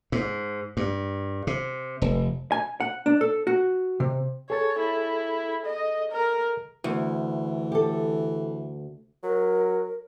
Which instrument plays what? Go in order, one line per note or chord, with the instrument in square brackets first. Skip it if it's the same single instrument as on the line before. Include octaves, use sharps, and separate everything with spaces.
[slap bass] G#2
G2
C3
F1
[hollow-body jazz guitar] G#5
F#5
D4
A4
F#4
C3
[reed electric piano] G#4 A4 A6 [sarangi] C#5
[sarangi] E4
D#5
A#4
[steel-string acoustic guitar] D2 [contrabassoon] E3
[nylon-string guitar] G4 A4
[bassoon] F#3 [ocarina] A#4